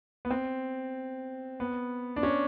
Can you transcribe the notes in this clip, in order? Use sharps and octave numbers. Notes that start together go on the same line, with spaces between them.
B3
C4
B3
D4
C#4